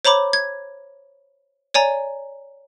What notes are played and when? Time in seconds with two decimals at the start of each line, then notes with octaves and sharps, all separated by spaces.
0.05 C5 C#5 A#5 B5 D6
0.33 G#6
1.74 C#5 D5 G#5 A#5